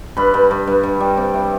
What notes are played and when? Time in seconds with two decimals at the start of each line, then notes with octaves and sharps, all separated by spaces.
0.17 G2 B4
0.34 G2
0.51 G2
0.67 G2
0.84 G2
1.00 G3
1.17 C3
1.34 C3